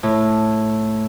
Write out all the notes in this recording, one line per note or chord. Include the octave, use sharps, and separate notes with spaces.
A2